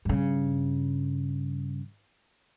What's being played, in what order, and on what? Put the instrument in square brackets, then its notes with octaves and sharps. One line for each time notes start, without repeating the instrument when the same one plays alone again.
[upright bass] G2 C#3